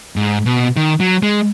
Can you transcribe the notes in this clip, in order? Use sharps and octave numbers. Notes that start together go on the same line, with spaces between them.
G#2
B2
D#3
F#3
G#3